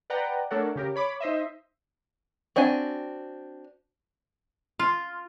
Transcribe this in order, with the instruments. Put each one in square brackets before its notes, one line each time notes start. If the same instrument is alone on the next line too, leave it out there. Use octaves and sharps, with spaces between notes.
[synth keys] B4 D5 F#5 G5 A#5
A3 D4 A4 A#4 C#5 F#5
C#3 G4 A#4
C#5 B5 D6
D#4 C5 D#5 E5
[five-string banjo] C4 D4 F#4 G#5
[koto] F4